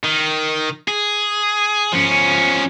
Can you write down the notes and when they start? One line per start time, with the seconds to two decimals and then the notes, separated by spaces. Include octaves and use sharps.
0.04 D#3
0.88 G#4
1.92 F3 C#4